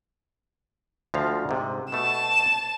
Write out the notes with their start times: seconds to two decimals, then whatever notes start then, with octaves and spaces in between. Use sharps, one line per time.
1.14 D2 F3 F5
1.49 G#2 C3
1.92 B2 A3 A5 E7